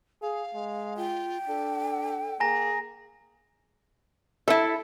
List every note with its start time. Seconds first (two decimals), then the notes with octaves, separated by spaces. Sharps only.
0.22 G#4 F5
0.55 G#3
0.97 F4 G5
1.48 D4 A4
2.40 A#3 G#4 G#5 A#5 A#6
4.48 E4 A4 E5